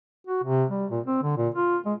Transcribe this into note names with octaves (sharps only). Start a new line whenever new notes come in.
F#4
C3
G3
A#2
C4
D3
A#2
F4
G#3